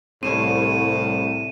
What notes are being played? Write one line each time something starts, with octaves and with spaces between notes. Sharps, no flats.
C2 A2 C4 C#5 D#7 E7